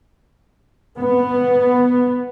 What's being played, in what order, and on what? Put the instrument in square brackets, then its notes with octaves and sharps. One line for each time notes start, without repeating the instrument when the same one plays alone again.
[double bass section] B3